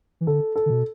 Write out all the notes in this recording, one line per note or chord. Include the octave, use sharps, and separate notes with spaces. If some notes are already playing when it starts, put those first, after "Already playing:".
E3
D3 A4
A4
D3
B2